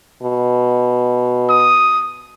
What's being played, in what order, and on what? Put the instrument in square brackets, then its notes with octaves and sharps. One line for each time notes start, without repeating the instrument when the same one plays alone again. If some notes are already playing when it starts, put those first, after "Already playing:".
[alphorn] B2
[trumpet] D#6